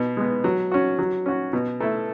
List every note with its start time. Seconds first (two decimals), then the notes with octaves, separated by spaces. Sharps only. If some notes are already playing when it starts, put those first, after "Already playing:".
Already playing: B2
0.17 G#3 B3
0.44 F#3
0.72 C#4 F#4
0.99 F#3
1.26 C#4 F#4
1.53 B2
1.80 A3 E4